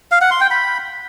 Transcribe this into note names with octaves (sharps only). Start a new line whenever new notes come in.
F5
F#5
C6
G5
B5